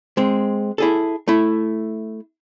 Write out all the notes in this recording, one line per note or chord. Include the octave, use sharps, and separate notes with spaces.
G#3 C4
E4 G#4 A4
A3 E4